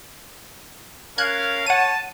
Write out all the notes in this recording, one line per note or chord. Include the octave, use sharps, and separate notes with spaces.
C#4 A#4 F5 F#6 G#6
C#5 F#5 A5 D#7